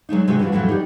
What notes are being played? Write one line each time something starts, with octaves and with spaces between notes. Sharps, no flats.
F#3 G#3 D4 D#4
C3 G#3 D4 F#4 C#5 D#5
E3 G3 D4 F4 F#4
F2 A2 E3 F#3 A3 F#4
D#4 G4 G#4 D5